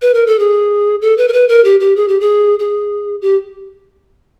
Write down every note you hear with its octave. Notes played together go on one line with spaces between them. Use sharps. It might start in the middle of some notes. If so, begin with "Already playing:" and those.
B4
A#4
A4
G#4
A4
B4
A#4
B4
A#4
G4
G4
G#4
G4
G#4
G#4
G4